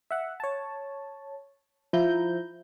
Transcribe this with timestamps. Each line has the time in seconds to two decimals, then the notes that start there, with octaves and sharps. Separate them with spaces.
0.11 E5 F#5
0.40 C#5 A5
1.93 F3 E4 A#5 G6